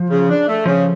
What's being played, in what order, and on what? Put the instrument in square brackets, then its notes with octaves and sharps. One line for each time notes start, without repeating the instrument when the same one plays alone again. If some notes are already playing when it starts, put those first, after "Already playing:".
Already playing: [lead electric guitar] F3
[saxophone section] C#3
D4
A3
[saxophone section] C#3 [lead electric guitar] F3